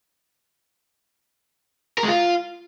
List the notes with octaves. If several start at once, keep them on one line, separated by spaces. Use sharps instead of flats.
A#4
G#3
F4